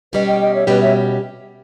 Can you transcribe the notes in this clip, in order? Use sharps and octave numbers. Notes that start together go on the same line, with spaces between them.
B2 G3 C#4 G4 B4 D#5
D#5 G5
D#5 G5
C#5 E5
B2 G3 C#4 G4 B4 D#5
C#5 E5